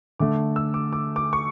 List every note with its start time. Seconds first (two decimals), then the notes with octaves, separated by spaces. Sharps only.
0.19 D3 A3 D6
0.56 E6
0.74 D6
0.93 D6
1.16 D6
1.33 C#6